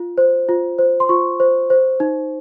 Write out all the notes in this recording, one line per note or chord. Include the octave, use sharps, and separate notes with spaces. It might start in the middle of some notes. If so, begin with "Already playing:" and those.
Already playing: F4
C5
F4
C5
C6
F4 C#6
C5
C5
D#4